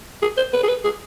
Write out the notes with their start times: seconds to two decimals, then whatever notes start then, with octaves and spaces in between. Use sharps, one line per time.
0.22 G#4
0.37 C5
0.53 B4
0.64 G#4
0.69 B4
0.84 G#4